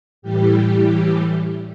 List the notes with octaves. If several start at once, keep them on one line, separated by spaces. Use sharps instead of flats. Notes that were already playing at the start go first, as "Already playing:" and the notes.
A2 E3 G3 G4